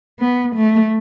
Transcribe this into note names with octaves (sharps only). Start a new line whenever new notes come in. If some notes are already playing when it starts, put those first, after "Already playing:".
B3
A3